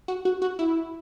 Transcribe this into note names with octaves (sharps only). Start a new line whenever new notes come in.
F#4
F#4
F#4
E4